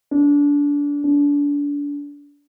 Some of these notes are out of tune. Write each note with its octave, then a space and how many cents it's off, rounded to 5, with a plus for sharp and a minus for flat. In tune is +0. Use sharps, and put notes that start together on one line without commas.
D4 -25
D4 -30